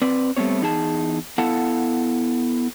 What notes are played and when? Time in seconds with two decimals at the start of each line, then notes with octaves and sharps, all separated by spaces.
0.02 C4 B4 D5
0.37 G3 A3 B3 C4 C#5
0.61 E2 D#4 G#4 A5
1.38 B3 E4 A4 F5 F#5 A5